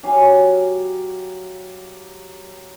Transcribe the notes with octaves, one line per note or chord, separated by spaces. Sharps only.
F#3 G4 F5 G#5